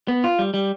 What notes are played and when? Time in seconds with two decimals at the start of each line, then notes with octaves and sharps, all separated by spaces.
0.08 B3
0.24 F4
0.39 G3
0.54 G3